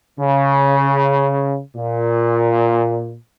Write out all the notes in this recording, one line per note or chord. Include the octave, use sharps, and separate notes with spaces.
C#3
A#2